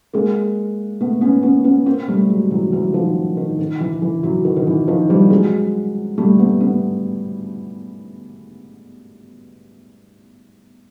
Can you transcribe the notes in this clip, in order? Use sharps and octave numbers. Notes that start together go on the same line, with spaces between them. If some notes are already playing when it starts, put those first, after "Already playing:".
G#3 A#3
A3 B3
B3 C#4
B3 C#4
B3 C#4
A#3 C4
G3 A3
F#3 G#3
E3 F#3
E3 F#3
D#3 F3
D#3
D#3
E3
E3
E3 F#3
D#3
D#3
E3
D#3 F3
F3 G3
F#3 G#3
G3 A3
A3 B3
A3 B3